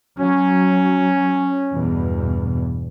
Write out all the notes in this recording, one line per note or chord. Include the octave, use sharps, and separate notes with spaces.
F#3 C#4
E2 G2 B2